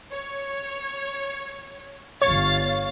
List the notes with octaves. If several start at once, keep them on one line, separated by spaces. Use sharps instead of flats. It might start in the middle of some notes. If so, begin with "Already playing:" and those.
C#5
G1 C#5 F5 A6